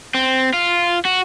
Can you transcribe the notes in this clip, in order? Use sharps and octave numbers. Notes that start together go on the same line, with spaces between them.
C4
F4
F#4